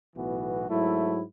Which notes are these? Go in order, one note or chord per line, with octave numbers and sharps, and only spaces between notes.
B1 A2 E3 B3 F#4
G#2 F#3 A3 E4